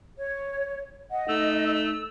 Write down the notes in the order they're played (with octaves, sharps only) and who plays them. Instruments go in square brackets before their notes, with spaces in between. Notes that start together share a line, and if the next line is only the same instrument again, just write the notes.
[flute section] C#5
[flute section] D#5 [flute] F#5
[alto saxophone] A3 [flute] D#4 [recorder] E6